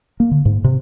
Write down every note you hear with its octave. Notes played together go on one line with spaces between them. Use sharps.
A#3
D3
G#2
C3